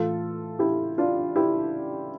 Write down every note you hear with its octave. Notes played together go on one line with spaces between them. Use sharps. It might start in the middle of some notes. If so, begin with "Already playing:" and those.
Already playing: A2 E3 F4 A4
E4 G4
D4 F4
E4 G4